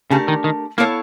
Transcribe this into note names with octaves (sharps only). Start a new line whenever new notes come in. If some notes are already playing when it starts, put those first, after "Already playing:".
C#3 A3 D4 G4 A#4
D#3
D#3
A#3 B3 E4 A4 C#5 F5